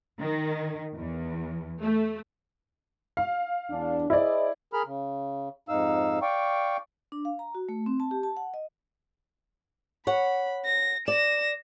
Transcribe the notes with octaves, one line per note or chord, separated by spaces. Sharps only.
D#3
E2
A3
F5
E2 D4
E4 G#4 C5 D5 D#5
G#4 A#4 B5 F6
C#3
F2 G#2 D#4 F5 E6
D5 F5 G5 C#6
D4
F5
A#5
F#4
A3
C4
A5
G4
A5
F#5
D#5
C#5 F#5 B5
A#6
D5 A#6 E7